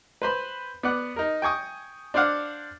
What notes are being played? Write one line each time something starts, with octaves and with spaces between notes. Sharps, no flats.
B4 C5 B5
B3 D5 F#5
D#4 A#4
G5 G#5 C#6 D#6
D4 C5 D5 F5 F#5